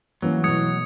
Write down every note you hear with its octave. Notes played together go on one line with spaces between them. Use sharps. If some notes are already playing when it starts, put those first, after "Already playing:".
E3 F#3 A#3 C#4
B2 A3 D#6 G#6 C#7